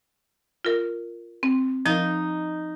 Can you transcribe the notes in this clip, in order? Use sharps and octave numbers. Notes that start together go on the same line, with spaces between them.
F4 A#4
C4
F3 D#4